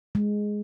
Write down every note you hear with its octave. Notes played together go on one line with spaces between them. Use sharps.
G#3